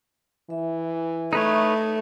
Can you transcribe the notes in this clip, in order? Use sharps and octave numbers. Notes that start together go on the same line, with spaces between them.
E3 E5
A3 D#4 B4 C#5